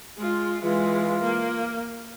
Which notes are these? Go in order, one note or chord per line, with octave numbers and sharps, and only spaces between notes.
G#3 F4
E3 G#3 F4
A#3